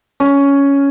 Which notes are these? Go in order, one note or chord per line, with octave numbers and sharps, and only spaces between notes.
C#4